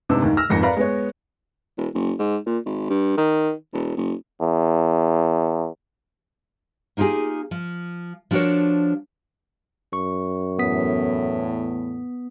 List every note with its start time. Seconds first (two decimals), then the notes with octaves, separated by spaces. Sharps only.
0.09 G#2 C3 B3 D4 E6
0.22 D#2 G#2
0.37 E6 F6 A#6
0.50 G#1 F2 G#2 A#6 C#7
0.62 A#4 B4 D5 F5 A#5 B5
0.77 G#3 B3 C#5
1.77 E1
1.94 F#1
2.19 G#2
2.46 A#2
2.66 G#1
2.89 G2
3.17 D#3
3.73 E1
3.96 F#1
4.41 E2
6.97 A#3 D#4 F4 G4 G#4
7.51 F3
8.31 F3 D4 F#4 G#4 A#4 C#5
9.93 F#2 C#6
10.59 E2 A2 B3 D#6 B6